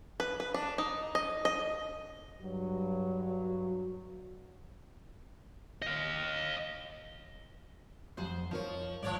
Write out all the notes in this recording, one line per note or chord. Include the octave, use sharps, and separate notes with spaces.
B4
B4
D4
D#4
D#5
D#5
G2 F#3
D#5 F5
F2 G#4 C5 F#5
F3 D#4 A#4 C#5
G#2 F3 C#5 D5